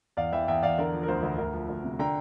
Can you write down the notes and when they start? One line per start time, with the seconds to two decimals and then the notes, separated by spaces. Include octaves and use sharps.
0.17 E2 D5 F5
0.32 E3 E5 G5
0.48 E2 E5 G5
0.63 E2 D5 F5
0.78 D3 A#4 D5
0.93 F3
1.03 A#4
1.08 D2 C5
1.23 D2
1.38 D2 A#4
1.53 F3
1.69 D2
1.84 C3
1.99 D3 G5 A#5